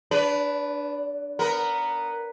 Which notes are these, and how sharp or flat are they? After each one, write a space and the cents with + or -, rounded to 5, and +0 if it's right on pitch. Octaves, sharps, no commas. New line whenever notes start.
D4 +0 B4 +5 D5 -40
B3 +0 A#4 +0